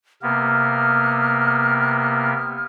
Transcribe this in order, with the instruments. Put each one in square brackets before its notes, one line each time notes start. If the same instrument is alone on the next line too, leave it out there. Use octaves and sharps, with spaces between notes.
[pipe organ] C3 A#3 B3 [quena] F6